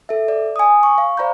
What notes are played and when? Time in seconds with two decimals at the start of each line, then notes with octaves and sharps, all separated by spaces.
0.09 A4 E5
0.28 D5
0.56 G#5 D#6
0.83 C#6
0.98 F5
1.17 C5 D5 F5 A#5 B5 G6